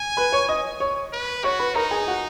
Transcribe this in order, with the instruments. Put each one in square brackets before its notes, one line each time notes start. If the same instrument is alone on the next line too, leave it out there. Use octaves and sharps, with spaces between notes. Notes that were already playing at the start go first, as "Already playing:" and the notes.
Already playing: [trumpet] G#5
[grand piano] B4 B5
C#5 C#6
D#5 D#6
C#5 C#6
[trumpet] B4
[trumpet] F#4 [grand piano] C#5 C#6
[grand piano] B4 B5
[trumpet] D#4 [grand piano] A#4 A#5
[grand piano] G#4 G#5
F#4 F#5